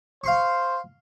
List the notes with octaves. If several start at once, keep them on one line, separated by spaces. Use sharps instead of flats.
C5 F5 C6 C#6